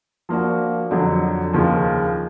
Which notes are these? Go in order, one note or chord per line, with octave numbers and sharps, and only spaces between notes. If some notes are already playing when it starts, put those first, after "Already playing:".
F3 A#3 D4 F#4
F2 D3 F#3
D#2 C#3 F3